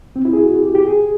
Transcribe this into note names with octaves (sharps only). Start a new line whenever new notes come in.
C4
E4
G#4
F#4
G4
G4
G#4